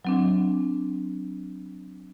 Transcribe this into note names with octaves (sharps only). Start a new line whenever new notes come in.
F#3 C4 D4